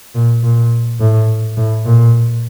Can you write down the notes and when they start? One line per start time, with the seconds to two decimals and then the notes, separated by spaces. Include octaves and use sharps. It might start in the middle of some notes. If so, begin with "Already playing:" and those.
0.15 A#2
0.43 A#2
1.00 A2
1.57 A2
1.85 A#2